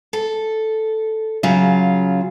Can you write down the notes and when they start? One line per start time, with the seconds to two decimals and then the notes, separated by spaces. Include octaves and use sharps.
0.13 A4
1.43 C#3 F#3 F4